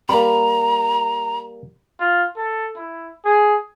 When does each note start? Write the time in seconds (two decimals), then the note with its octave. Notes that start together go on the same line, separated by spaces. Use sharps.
0.09 G3 A#3 A#5 B5
2.00 F4
2.37 A4
2.76 E4
3.25 G#4